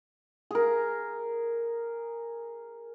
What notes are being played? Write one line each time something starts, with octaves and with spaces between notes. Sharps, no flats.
G#4 A#4